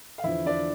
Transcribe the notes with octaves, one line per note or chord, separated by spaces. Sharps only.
F5
E2 D3 F3 E4 E5
D4 D5